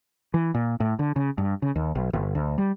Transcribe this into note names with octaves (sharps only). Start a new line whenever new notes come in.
E3
A#2
A2
D3
C#3
G2
C#3
D#2
B1
G1
D2
G3